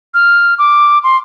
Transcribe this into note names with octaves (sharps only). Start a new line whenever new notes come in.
F6
D6
C6